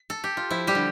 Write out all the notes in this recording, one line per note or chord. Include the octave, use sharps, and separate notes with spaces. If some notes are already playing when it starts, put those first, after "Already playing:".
Already playing: B4
A4
G4
F4
F3 E4
G3 G4
D3